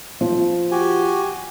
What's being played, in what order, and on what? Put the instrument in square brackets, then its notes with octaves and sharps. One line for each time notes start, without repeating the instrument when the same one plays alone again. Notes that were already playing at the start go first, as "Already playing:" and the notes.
[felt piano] F3
[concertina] F#4 G4 G#5